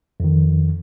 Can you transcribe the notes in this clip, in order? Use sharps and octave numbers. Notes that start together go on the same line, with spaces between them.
F2 D#3